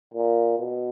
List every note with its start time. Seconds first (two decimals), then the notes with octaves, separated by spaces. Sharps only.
0.14 A#2
0.59 B2